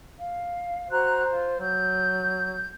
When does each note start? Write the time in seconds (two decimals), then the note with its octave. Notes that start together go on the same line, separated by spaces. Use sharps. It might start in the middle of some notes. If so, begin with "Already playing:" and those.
0.17 F5
0.90 F#4 C5 A#5 F#6
1.28 F4
1.60 F#3 G6